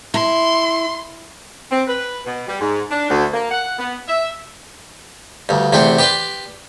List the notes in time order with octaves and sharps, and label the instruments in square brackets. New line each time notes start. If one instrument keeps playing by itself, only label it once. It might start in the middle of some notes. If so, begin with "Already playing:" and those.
[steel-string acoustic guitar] E4 [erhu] C6
[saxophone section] C4
B4
B2
G3
G#2
D4
D2
A#3
F#5
B3
E5
[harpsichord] D2 G2
E2 C3 A3 C5 G5
G4 B4 D5 B5 C6